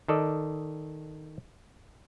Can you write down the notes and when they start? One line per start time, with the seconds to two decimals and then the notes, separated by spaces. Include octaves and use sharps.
0.08 D#3 A4 D5 D#5